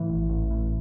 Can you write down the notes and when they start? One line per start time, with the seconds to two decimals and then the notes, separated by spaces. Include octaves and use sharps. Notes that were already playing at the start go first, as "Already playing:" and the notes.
Already playing: A2 E3
0.10 A1
0.30 A1
0.51 A2